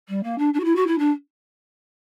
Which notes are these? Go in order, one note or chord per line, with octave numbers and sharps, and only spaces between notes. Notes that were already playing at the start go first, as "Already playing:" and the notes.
G3
A#3
D4
D4
F#4
E4
F#4
E4
D4